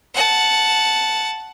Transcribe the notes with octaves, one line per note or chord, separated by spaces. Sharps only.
F#5 A5